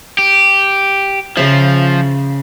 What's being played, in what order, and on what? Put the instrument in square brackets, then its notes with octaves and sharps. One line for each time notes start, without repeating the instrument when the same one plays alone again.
[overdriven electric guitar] G4
[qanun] C#3 E5 [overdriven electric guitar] F3